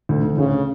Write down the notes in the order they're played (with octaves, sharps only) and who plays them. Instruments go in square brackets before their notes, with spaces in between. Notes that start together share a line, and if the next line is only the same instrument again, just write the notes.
[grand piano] D2
D2
[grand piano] D2 [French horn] C#3